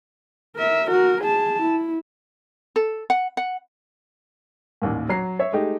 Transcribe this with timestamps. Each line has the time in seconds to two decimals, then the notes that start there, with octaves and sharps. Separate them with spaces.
0.56 A#4 E5
0.88 F#4 A#4
1.22 G#4 A5
1.62 E4
2.76 A4
3.10 F#5
3.37 F#5
4.82 A1 D#2 A#2
5.09 F#3 A#5 C7
5.39 C#5 E5
5.52 G#3 A3 D#4 G4